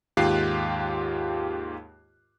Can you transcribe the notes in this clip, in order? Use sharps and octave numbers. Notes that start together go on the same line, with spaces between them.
D#2 G#2 F4 G4 F#6 C7